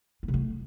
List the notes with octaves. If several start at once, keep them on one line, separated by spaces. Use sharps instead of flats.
B3
C3
A3